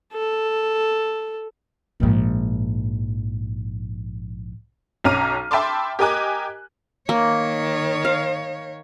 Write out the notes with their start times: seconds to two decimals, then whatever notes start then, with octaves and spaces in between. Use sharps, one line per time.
0.14 A4
2.00 A#1 G#2
5.04 B1 C#4 A#5 D6 F6 D#7
5.51 E5 G5 A5 B5 C6 D6
5.99 G4 A#4 D#5 G#5 D6 F#6
7.09 D#3 A#3 C#5
8.05 F5